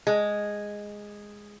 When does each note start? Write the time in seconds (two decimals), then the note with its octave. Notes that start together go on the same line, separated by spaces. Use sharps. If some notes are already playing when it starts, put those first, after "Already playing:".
0.07 G#3